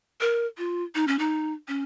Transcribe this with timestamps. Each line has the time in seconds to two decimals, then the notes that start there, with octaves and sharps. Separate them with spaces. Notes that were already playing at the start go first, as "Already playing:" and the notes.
0.21 A#4
0.58 F4
0.95 D#4
1.08 C#4
1.19 D#4
1.68 C#4